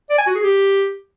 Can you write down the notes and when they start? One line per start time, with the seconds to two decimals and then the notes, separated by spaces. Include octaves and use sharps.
0.10 D5
0.18 G#5
0.27 F#4
0.35 G#4
0.43 G4